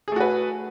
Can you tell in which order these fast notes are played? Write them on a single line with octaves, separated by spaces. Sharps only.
G#4 A3 F#4 B4